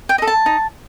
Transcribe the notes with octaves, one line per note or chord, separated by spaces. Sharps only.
G5
D#5
A4
A5
D#4